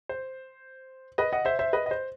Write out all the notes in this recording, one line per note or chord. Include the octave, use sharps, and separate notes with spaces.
C5
B4 D#5
D#5 F#5
C5 E5
C5 E5
B4 D#5
D#5
C5